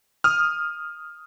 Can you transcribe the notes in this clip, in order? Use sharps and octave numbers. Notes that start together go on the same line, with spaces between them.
D#6 F6